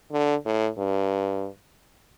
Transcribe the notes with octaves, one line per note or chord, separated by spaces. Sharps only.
D3
A2
G2